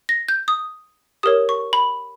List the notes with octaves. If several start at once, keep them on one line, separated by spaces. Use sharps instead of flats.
A#6
G6
D#6
G4 A#4 C#5 D#6
C#6
B5